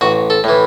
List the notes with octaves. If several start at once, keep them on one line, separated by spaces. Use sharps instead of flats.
A1 F#4
A4
A2 E3